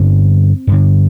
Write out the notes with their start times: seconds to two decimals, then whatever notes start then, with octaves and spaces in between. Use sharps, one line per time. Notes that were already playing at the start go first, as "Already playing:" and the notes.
Already playing: G2 D3 C4
0.67 G2 D3